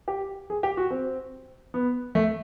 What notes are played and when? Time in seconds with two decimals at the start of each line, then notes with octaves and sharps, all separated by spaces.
0.08 G4
0.50 G#4
0.63 G4
0.77 F#4
0.91 C4
1.74 B3
2.15 A3